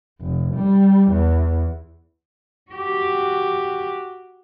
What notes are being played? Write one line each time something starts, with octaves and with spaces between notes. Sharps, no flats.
F1
G3
E2
F#4 G4